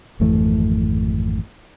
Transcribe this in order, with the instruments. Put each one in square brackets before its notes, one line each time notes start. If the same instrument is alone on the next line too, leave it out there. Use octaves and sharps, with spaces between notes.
[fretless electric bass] G#1 F2 E3 A3